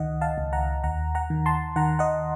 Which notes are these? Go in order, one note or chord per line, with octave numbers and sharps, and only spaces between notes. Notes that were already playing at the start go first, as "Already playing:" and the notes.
Already playing: C#2 D#3 D#5 F#5
F5 A5
C#2
F#5 A#5
D#2 F#5 A#5
F#5 A#5
D#3
A5 C6
D#3 F#5 A#5
D#5 F#5